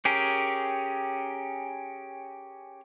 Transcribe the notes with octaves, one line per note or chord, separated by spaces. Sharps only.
C#4 G4 G#4 A#4